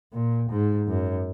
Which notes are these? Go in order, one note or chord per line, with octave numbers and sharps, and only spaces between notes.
A#2
G#2
F#2